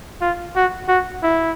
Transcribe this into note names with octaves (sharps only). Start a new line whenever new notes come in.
F4
F#4
F#4
E4